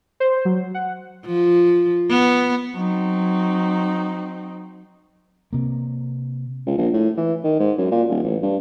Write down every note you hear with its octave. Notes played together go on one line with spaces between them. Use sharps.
C5
F#3
F#5
F3
B3
F#3 C4 D#4
C3 A#3
C#2
A#1
A2
E3
D#3
G#2
F#2
A#2
D#1
A1
G2